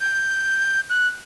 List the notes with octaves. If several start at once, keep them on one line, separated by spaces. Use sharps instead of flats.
G6
F#6